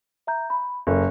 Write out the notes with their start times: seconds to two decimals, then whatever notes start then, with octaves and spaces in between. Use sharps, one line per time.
0.27 E5 A#5 G6
0.50 B5
0.87 F#1 A4 A#4